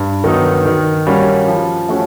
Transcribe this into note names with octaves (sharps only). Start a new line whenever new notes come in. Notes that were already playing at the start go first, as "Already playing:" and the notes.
Already playing: G2
D#3 F#3 B3 D#4
D#3
G3 A#3 C#4 F#4
F3
A3 C#4 F#4